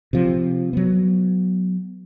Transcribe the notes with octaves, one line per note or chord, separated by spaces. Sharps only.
C3 F3
F#3 B3